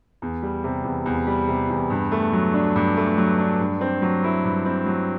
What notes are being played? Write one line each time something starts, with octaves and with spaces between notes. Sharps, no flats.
E2
G3
C3
E2
E2
G3
C3
E2
G2
A3
F#3
D4
G2
A3
F#3
D4
G2
C4
F#3
E4
G2
C4
F#3